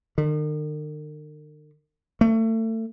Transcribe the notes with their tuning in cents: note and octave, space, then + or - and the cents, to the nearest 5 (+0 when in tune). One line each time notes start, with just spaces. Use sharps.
D#3 -45
A3 +30